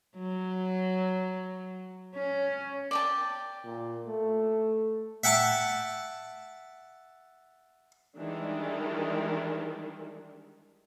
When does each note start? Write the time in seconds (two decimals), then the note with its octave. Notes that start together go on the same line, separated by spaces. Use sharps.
0.18 F#3
2.15 C#4
2.91 D5 G5 A5
3.64 A#2
4.06 A3
5.24 E5 F#5 G5 A5
8.17 D#3 E3 G3 G#3 D4 D#4